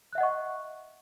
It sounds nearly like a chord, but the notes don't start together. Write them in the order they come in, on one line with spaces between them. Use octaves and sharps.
F#6 E5 F#5 D#5 C#6